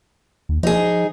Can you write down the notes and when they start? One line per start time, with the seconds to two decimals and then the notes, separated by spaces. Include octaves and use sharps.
0.49 D#2
0.63 F3 D#4 G#4